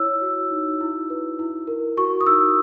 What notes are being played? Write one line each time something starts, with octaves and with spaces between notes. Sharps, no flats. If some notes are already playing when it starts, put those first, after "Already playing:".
Already playing: E4 C#5 E6
F#4
D#4
E4
B4
E4
A#4
F#4 C#6
D#6
D#4 E6